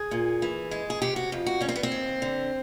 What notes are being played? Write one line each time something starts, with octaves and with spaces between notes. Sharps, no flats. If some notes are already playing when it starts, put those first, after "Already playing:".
Already playing: G#4
A#2
E3
G#3
G#4
C3 G4
F#4
F2
F#4
G3 C#4
C4
B3
C4
D#2
D3